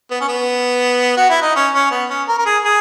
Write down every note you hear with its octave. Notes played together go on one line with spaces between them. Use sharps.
B3
C#4
B3
F#4
E4
D#4
C#4
C#4
B3
C#4
A#4
A#4
G#4
G#4